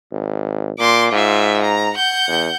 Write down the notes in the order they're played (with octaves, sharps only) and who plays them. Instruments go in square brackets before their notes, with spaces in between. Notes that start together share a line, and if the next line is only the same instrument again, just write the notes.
[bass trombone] G#1
[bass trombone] A#2 [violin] C6 D6
[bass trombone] G#2 [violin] F4 E5
[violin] A#5
F#5 G6
[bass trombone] E2